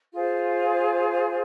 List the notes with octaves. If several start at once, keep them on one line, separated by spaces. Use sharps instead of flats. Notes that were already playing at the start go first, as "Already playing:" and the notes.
F4 G#4 C5